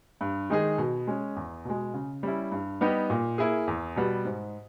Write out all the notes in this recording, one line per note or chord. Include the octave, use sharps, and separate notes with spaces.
G2
D#3 G#3 D#4 G#4
B2
G#3 C#4
E2
B2 G#3
C#3
G3 C#4 E4
G2
G3 B3 D#4 G4
A#2
A#3 E4 G#4
E2
B2 G3 B3
G#2